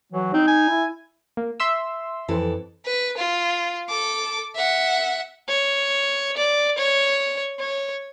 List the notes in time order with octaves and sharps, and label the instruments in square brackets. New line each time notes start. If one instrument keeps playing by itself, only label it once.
[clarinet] E3 [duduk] F#3
[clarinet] C4 [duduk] D#4
[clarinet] G#5
[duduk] E4
[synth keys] A#3
E5 C6 E6
[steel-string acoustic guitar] F2 E3 A4
[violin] B4
F4
A4 D6
E5 F#5
[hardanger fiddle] C#5
D5
C#5
C#5